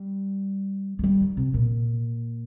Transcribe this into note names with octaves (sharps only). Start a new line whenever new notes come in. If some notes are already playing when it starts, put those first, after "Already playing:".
Already playing: G3
G#3
G3
D#3
C3
A#2